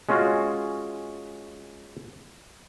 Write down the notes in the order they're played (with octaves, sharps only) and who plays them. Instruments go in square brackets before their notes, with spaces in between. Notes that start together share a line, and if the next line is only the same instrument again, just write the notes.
[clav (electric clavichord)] G#3 C#4 F4 F#4